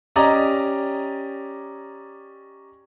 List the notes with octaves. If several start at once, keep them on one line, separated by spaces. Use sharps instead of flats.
C#4 G4 D5 D#5 A#5